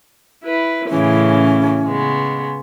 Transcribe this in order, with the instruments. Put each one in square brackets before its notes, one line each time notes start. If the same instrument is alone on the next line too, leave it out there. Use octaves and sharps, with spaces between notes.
[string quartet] E4 B4
[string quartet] A2 C#3 E3 [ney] C#4
[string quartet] C#3 G#3 B3